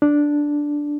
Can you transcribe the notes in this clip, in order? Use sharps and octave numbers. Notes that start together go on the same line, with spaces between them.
D4